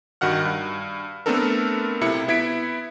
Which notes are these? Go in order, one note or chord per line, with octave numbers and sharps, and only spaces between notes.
G2 D#3 F#4 F#5 F6
G2
A3 B3 C4 D4 A4 A#4
B1 C3 E4 B5 C#7
B3 E4 G#6 B6 D7